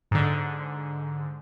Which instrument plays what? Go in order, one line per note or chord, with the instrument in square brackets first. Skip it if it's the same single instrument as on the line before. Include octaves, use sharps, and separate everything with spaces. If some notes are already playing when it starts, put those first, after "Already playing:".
[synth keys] G#2 D3